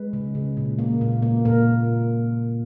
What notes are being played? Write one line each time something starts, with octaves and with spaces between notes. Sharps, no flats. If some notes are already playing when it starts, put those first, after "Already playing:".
Already playing: G#3 B4
C#3
C#3
A#2
A#3
A#2
A#3
A#2 A#4